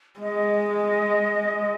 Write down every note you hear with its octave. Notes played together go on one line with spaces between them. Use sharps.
G#3 D#5